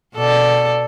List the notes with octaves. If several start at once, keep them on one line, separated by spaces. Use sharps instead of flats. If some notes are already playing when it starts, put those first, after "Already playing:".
B2 A4 D5